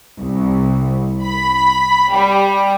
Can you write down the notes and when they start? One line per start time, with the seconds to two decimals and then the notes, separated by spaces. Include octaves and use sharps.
0.20 C2
1.23 B5
2.12 G3